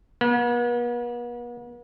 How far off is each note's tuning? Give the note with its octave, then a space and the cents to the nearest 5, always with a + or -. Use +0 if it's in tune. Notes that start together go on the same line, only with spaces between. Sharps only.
B3 -45